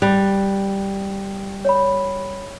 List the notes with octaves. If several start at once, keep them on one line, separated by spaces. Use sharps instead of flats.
G3 F#6 F7
C#5 D5 B5